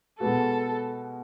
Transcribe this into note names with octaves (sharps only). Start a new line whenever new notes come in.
B2 G#3 B3 F#4 A4